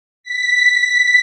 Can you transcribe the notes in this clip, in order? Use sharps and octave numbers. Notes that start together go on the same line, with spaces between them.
B6